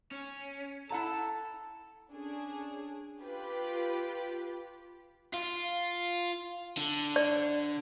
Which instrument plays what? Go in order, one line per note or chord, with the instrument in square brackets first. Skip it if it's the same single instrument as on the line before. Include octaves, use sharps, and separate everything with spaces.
[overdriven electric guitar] C#4
[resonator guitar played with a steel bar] E4 F#5 A#5 [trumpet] A4 [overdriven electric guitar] A5
[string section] C#4 D4 G#4
F4 G4 B4
[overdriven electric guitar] F4
D3
[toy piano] D5